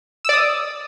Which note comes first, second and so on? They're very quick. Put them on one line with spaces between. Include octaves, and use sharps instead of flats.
E6 D5 D#6